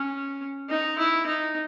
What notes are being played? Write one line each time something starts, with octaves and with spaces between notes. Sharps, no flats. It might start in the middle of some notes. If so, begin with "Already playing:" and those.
Already playing: C#4
D#4
E4
D#4